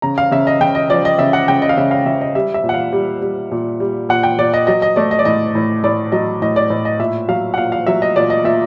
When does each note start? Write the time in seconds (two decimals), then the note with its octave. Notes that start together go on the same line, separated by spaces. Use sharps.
0.02 C#3 A#5
0.18 F5
0.32 C#3 E5
0.47 D#5
0.61 C#3 G5
0.75 D#5
0.90 F3 D5
1.05 D#5
1.19 C#3 E5
1.33 F#5
1.48 C#3 G5
1.62 D#5
1.69 F5
1.77 C#3 E5
1.91 F5
2.06 C#3 E5
2.21 D#5
2.35 G3 E5
2.54 E5
2.64 A#2
2.69 F#5
2.74 F5
2.93 G3
3.22 G3
3.51 A#2
3.80 G3
4.09 A#2 F#5
4.23 G5
4.38 A#2 D5
4.54 D#5
4.67 F#3 D#5
4.82 D#5
4.96 A3 D5
5.11 D#5
5.19 D5
5.25 A2 D#5
5.55 A2
5.84 A2 D5
6.12 F#3 D#5
6.42 A2 D#5
6.56 D5
6.70 A2 D#5
6.85 D#5
6.99 A#2 E5
7.28 F#3 F5
7.54 F#5
7.57 A#2 F5
7.72 F5
7.87 F#3 E5
8.02 D#5
8.16 A#2 D5
8.30 D#5
8.44 A#2 E5